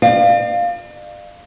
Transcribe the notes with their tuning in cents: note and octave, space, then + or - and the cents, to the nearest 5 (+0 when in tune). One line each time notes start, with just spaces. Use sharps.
D5 +45 F5 +0